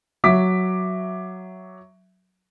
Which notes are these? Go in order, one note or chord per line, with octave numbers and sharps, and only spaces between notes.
F#3 E5 D6 B6